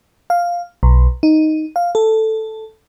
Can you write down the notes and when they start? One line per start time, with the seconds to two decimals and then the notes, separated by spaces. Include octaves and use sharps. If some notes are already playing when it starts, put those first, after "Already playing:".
0.30 F5
0.83 B1
1.23 D#4
1.76 F5
1.95 A4